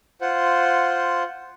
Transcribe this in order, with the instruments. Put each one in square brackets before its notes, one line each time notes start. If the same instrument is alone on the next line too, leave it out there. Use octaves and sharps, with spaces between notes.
[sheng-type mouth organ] F4 C5 F#5